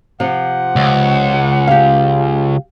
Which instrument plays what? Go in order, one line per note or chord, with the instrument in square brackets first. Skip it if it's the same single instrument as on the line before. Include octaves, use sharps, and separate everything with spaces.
[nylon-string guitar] C3 F3 [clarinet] F#5
[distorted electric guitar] C#2
[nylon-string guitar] G4 F5